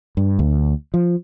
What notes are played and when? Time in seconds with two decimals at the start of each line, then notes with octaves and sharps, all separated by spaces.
0.17 G2
0.39 D2
0.94 F3